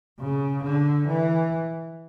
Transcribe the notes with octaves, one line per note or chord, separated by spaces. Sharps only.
C#3
D3
E3